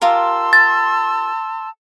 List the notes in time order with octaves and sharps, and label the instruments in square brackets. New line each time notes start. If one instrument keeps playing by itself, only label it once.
[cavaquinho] F4 G4 A#4 [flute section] A5 C6 E6
[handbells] A6